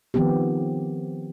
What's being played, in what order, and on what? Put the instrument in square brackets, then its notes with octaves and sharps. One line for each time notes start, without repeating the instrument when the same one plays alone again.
[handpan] D#3 F3 B3 C4 G4